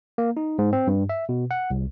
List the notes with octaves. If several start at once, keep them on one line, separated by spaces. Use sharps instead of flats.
A#3
D#4
G#2
C4
G2
E5
B2
F#5
C2